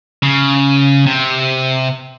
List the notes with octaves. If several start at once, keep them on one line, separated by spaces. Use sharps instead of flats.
C#3
C3